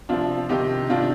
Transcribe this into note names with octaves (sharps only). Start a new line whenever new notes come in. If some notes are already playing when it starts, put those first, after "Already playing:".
C3 F3 D4 F4
C3 D#3 D#4 G4
C3 D#3 D4 F4